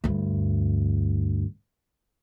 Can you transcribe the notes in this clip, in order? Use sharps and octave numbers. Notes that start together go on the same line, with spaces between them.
D2 G2